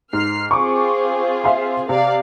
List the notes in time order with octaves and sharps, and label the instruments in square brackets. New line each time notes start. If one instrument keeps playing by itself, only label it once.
[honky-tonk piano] G#2 [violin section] F6 C7
[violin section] C4 F4 G#4 [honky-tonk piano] C#6 D6
[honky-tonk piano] E5 F5 C6
[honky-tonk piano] C3 [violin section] D5 F5